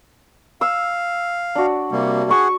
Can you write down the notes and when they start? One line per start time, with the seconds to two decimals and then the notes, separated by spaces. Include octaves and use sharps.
0.61 F5 E6
1.55 D4 F#4
1.92 C3 G3 A#3
2.30 G#4 F#5 C#6